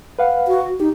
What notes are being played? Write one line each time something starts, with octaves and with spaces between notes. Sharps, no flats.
B4 F5 F#5
F#4
D#4 G4